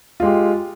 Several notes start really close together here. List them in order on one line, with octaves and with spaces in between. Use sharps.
F4 G#3 G4